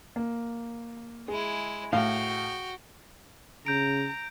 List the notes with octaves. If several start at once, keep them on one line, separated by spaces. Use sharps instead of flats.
A#3
G#3 E4 G#4
A2 F#4 F5 G5
C#3 A#5 G6 D7